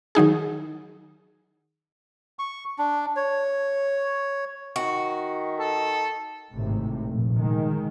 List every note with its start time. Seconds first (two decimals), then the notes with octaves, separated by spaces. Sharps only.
0.15 D#3 F#3 D#4 G#4
2.39 C#6
2.78 D4
3.16 C#5
4.76 D#3 F#4
5.59 A4
6.53 G#1 A2 C3
7.07 F1 A#1
7.36 D#3 G#3